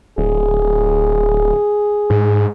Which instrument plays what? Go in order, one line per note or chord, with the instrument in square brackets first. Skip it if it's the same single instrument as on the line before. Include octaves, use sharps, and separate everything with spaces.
[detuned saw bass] D1 [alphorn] G#4
[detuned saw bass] G#2